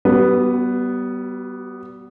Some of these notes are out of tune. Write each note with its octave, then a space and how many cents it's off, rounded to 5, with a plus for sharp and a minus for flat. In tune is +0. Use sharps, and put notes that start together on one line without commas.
G3 -30 B3 +0 F#4 +0